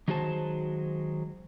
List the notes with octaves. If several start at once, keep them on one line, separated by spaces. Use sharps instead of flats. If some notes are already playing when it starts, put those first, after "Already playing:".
D#3 F#3 G#3 F#4 C5 A5